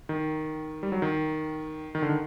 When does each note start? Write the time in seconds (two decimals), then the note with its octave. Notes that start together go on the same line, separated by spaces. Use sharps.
0.09 D#3
0.83 G3
0.92 F#3
1.02 D#3
1.95 D#3
2.02 D3
2.09 D#3